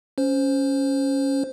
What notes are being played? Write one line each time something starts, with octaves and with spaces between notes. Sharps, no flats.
C#4 C5